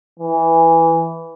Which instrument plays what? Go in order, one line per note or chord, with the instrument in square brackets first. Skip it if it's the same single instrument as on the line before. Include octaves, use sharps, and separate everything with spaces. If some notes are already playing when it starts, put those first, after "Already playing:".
[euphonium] E3